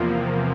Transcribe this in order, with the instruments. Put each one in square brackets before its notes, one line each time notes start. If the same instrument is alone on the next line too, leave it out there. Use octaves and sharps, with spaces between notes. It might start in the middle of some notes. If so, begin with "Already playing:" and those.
Already playing: [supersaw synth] E2 C3 F3 A#3